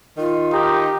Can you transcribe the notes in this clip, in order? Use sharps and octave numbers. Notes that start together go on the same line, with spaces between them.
D#3 F4
D#4 G4